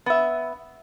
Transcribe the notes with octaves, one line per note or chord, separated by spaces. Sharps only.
B3 E5